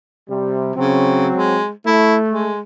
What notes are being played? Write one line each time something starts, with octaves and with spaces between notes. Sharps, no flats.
C3 G3
C#3 F#3 C4
G#3
A3 E4
G#3